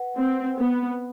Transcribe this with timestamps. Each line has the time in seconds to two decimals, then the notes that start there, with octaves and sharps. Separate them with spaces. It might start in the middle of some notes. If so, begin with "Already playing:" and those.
Already playing: B4 F#5
0.17 C4
0.57 B3